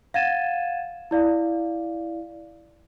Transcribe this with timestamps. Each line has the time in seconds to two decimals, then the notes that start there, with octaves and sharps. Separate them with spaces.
0.14 F5 F#5 G#6 A6 D#7 E7
1.11 E4 D5 F5